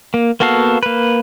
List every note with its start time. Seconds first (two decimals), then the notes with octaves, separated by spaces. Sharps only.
0.14 A#3
0.40 A#3 B3 F#4 A4 F5
0.83 A#3 B4